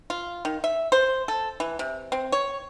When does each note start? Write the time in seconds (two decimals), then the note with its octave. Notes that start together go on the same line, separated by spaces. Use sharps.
0.10 F4
0.45 D#3
0.64 E5
0.92 C5
1.28 A4
1.60 E3
1.79 C3
2.12 C4
2.32 C#5